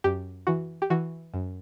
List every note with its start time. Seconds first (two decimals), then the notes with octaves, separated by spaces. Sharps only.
0.04 F#2 G4
0.47 E3 F#4
0.82 G4
0.90 E3 F#4
1.34 F#2